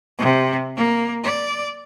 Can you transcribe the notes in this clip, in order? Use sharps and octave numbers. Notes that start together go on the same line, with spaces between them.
C3
A#3
D5